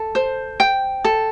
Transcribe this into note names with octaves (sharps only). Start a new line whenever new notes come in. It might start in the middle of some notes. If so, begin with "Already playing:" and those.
Already playing: A4
C5
G5
A4